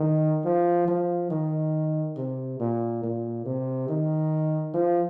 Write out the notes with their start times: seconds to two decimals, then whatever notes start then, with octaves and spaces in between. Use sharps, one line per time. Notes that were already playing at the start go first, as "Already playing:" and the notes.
Already playing: D#3
0.45 F3
0.88 F3
1.30 D#3
2.17 C3
2.60 A#2
3.03 A#2
3.46 C3
3.89 D#3
4.74 F3